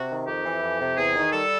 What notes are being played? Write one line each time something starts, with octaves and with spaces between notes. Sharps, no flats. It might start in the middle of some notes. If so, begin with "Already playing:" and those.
Already playing: C3 F#4
D#3
F2 G4
E3
F2
C3
E2 G#4
D#3
G3 A4